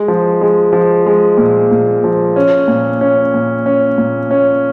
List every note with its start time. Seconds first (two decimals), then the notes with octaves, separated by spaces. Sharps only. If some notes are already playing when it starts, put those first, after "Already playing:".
Already playing: G#3
0.08 F3
0.41 G#3
0.73 F3
1.06 G#3
1.38 A#2
1.71 A#2
2.04 F3
2.36 C#4
2.68 A#2
3.01 C#4
3.34 A#2
3.66 C#4
3.98 A#2
4.31 C#4